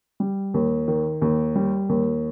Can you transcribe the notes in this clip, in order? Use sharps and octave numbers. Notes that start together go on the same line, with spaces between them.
G3
D#2
D#3
D#2
G3
D#2